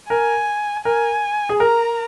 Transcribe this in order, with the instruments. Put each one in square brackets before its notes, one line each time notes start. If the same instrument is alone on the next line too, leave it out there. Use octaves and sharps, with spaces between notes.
[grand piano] A#4 [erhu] G#5
[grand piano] A#4 [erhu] G#5
[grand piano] G#4
[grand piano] A#4 [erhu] A#5